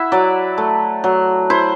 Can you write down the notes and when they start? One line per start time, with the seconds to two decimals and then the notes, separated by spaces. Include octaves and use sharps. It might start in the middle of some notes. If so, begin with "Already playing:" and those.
Already playing: E4 E5 F#5
0.12 F#3 D5
0.58 A3
1.04 F#3
1.50 E4 C5